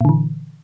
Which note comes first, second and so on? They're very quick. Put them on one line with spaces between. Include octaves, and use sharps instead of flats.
A#2 D3 E3